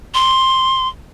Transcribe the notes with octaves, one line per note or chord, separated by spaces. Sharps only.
C6